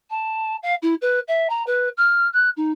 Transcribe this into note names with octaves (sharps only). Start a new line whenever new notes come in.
A5
F5
E4
B4
E5
A#5
B4
F6
F#6
D#4